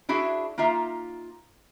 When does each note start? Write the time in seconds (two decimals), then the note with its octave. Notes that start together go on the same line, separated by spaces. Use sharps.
0.09 D4 E4 F#4 G#4 E5
0.58 A#3 D#4 F4 E5